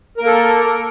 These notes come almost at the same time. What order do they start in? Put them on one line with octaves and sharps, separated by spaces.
A#4 A#3 A4